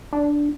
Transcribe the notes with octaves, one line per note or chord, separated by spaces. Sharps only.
D4